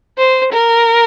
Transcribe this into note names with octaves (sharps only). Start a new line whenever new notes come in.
C5
A#4